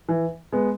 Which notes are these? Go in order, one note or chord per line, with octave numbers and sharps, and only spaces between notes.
E3
G#3 B3